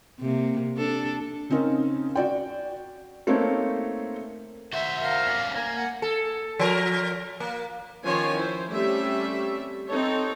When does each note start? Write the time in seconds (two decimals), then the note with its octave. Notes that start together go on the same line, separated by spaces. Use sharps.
0.20 C3 A#3
0.77 D4 A4
1.50 C#3 C4 C#4 D#4 A#4
2.16 F#4 D5 G5
3.27 A3 A#3 C4 D#4 C5 C#5
4.73 F#4 C5 E5
5.02 A#4 F5
5.27 C#4 D5
5.56 A#3 A#4 G#5
5.76 F#5
6.02 A4
6.59 F3 A#4
7.40 A#3
8.04 D#3 F3 C#4 F4 C#5 G#5
8.36 E4 C5
8.69 G3 A3 C4 C#4 G4 E5
9.89 C4 D#4 A4 C#5